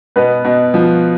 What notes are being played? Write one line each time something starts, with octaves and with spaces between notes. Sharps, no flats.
B2 B3 B4
B2
F3